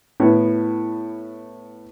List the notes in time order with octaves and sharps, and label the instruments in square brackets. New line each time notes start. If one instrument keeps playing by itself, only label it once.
[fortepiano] A2 B3